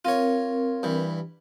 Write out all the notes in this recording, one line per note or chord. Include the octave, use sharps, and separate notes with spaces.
C4 F4 A#4 C#5
G2 E3